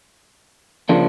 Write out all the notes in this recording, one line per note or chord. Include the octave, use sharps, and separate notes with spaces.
C#3 F3 A#3 D4